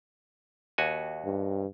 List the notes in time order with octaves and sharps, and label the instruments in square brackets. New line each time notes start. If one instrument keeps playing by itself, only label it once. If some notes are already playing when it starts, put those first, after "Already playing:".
[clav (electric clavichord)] D#2 F#4 G#5
[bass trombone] G2